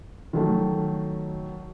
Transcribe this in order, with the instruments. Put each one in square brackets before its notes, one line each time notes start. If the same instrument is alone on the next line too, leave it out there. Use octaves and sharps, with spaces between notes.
[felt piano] D#3 F#3 A3